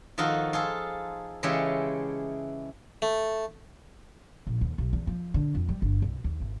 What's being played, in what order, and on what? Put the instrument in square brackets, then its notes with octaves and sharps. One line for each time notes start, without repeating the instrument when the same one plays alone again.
[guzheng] D#3 F3 D#4 F4 F#4 A4
F4 G#4 A4
C#3 E3 G#3 G4 A4 C#5
[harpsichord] A3
[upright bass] A#1
D#2
B1
E2
F3
D3
F2
G3
G1
C2
D#2
G#1